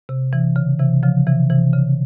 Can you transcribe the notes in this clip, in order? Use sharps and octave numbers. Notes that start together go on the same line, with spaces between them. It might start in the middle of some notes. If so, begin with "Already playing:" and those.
C3
C3 E3
C#3
C3 E3
C#3 F3
C3 E3
C3 E3
C#3